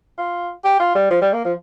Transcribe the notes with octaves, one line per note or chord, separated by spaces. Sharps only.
F4
G4
F4
G3
F3
G3
A#3
F3